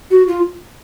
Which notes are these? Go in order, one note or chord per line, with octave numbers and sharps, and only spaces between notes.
F#4
F4